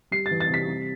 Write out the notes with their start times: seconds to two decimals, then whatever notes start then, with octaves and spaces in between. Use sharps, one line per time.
0.11 G3 C7
0.26 A6
0.31 E3
0.40 A6
0.49 C3 B6
0.68 G3